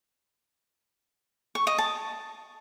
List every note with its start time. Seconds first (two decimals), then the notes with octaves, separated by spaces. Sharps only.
1.55 C#6
1.67 D#5
1.78 A5